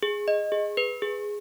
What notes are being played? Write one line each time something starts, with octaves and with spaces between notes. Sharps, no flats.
G#4
D#5
G#4
B4
G#4